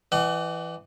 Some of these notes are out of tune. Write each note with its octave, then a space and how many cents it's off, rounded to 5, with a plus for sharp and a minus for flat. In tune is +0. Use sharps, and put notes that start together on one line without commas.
E3 +10 D#5 -45 F#5 +35